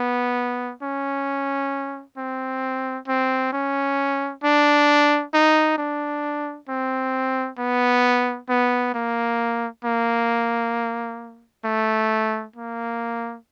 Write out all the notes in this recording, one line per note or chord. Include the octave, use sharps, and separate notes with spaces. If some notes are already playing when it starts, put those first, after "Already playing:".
Already playing: B3
C#4
C4
C4
C#4
D4
D#4
D4
C4
B3
B3
A#3
A#3
A3
A#3